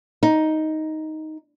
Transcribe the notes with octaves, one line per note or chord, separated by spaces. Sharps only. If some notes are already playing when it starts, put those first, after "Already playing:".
D#4